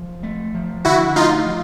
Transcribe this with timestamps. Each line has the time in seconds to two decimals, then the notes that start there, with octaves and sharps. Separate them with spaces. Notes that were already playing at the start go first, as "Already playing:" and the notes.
Already playing: F3
0.23 A3
0.54 F3
0.85 D3 E4 F#4
1.16 A3 D#4 F4
1.46 F3